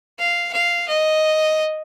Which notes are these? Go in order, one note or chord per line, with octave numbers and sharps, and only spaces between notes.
F5
F5
D#5